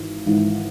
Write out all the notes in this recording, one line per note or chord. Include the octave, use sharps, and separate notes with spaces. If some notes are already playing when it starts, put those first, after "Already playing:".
Already playing: G#1 G#2 E3
G#1 G#2 E3